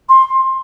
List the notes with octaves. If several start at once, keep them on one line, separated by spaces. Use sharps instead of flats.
C6